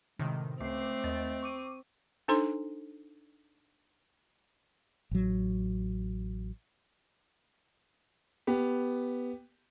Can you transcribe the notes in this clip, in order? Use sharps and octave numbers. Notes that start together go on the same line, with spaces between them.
A2 C3 D#3 G#3
C#2 A3 C4 D6 C7
D#2 D#5 A6
C#6 D6 D#7
D4 D#4 A4 C5 C6
A1 F#3
B3 G4